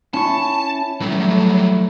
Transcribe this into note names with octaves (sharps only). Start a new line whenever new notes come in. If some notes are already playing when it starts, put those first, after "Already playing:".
C#4 E4 A5 C#6
E3 F#3 G3 A3